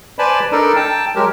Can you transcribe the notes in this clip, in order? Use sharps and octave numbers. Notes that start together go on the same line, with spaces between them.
B4 C5 D5 G#5 A5 B5
D4 D#4 A4 A#4 D5
G5 A5
F#3 G#3 G4 A#4